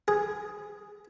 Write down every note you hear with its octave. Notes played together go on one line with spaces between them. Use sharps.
G#4